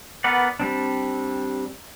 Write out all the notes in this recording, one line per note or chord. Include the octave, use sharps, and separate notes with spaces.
B3 A#4 B4 D5 F#5
G3 C4 D4